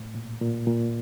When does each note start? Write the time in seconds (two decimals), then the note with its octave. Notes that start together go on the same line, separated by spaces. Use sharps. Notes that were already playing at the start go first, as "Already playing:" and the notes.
Already playing: A2
0.15 A#2
0.41 A#2
0.67 A#2